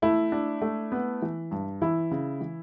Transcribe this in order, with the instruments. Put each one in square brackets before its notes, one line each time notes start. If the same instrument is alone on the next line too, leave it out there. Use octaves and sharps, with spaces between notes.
[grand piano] A3 [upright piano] E4
[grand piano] D4
A3
B3
E3
G2
[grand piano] E3 [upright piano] E4
[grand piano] C#3
E3